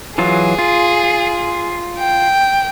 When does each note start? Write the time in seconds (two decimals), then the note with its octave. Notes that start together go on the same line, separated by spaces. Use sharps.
0.18 E3 F#3 F4 G#4
0.59 F4
1.98 G5